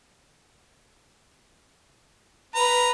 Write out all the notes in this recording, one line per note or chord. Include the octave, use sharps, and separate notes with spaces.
B4 A#5